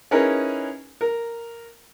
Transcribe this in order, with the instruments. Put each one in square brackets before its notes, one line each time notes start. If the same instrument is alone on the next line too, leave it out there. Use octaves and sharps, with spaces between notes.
[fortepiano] C#4 D#4 E4 G#4 A#4 B4
A#4